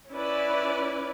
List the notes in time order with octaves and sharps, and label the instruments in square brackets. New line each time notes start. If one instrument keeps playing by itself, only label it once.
[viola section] C#4 E4 B4 D5